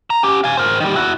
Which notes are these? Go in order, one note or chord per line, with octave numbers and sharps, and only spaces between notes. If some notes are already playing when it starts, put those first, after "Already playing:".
A#5
C#4 G4
F5 G#5
A#4 C5
D#3 G3
E4 F#4